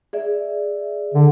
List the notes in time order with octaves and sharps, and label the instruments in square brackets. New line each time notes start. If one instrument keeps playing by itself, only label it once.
[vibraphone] G#4 D5 E5
[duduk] D3